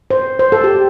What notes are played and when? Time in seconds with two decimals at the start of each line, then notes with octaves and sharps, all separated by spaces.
0.10 C5
0.39 C5
0.52 A4
0.64 G4